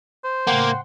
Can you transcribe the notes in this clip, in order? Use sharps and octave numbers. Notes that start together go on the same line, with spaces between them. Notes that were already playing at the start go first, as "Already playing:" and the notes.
C5
A2 C#3 A#3 F#5 G5 C6